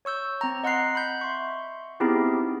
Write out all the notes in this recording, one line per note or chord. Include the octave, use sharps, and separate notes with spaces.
C#5 C#6 E6 G6
C4 A#5
D#5 F#5 C6 F#6 C7
B5 G6 B6
E5 C6 C#6
B3 C4 D#4 E4 G4 G#4